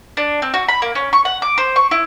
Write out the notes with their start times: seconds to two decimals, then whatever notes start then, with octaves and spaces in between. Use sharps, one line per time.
0.17 D4
0.42 C4
0.54 F#4
0.68 B5
0.82 A#3
0.95 C#4
1.13 C#6
1.25 F#5
1.42 D6
1.58 C5
1.76 C#6
1.91 E4